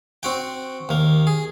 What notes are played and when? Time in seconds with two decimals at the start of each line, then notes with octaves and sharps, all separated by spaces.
0.23 C4 F#4 G5
0.89 D#2 A#3
1.27 G#4